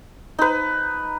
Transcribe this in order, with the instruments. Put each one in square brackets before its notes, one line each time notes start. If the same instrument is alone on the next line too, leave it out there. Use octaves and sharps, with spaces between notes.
[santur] D#4 B4